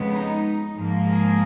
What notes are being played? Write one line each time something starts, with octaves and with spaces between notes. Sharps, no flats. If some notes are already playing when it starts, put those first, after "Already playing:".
Already playing: F2 C#3 G#3 B3
D#4
G#2 F3 A#3
G#4